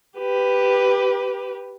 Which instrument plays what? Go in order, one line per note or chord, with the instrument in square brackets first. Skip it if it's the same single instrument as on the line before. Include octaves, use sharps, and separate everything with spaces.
[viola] G4 B4